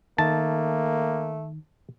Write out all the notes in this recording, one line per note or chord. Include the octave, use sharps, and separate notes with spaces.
D#3 A3 A#3 A5